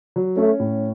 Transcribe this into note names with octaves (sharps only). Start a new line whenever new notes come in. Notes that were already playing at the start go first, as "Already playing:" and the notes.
F#3
A3 C#4
A2